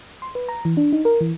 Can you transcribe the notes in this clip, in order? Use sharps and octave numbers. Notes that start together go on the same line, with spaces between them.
C6
B4
A#5
E3
D4
D#4
A#4
E3